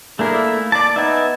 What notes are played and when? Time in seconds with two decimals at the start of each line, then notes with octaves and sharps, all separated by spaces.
0.19 A3 A#3 D4 E4 G#4 A#4
0.33 E5
0.72 D5 A5 D6
0.96 B3 D#4 E5 G#5